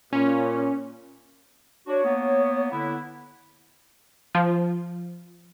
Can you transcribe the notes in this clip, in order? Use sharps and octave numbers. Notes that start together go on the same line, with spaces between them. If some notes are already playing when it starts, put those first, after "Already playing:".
A#2 C#4
D4 F#4 C#5
A#3 B3
D3 B3 E4
F3